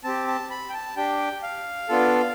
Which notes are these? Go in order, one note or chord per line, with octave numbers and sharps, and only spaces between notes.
C4 G4 A5
A5
B5
G5
A5
D4 G4 G5
F5
B3 D4 F4 A4